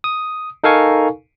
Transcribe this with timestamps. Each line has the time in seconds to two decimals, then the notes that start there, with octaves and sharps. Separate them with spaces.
0.04 D#6
0.64 D#4 A4 A#4 F5 G#5 C#6